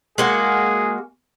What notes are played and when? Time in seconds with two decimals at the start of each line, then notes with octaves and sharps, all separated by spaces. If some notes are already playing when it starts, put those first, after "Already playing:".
0.18 G#3 A#3 F#4 G#4